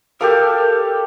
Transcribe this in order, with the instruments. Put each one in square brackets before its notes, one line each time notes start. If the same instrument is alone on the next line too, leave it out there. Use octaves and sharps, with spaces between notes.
[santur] G4 A4 F5 [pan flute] A#4